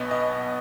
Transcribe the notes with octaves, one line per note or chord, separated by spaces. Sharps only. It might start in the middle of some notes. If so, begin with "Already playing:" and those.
Already playing: B1 B2 B3 D#5
D#5